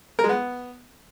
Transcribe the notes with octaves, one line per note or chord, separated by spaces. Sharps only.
A#4
G#3
B3